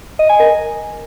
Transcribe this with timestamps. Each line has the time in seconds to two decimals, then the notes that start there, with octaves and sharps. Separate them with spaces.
0.19 D#5
0.29 G#5
0.40 A#4